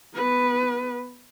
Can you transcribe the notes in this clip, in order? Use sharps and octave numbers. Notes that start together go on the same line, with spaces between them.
B3 B4